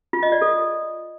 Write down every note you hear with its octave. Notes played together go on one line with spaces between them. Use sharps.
F4
D#5
D5
A4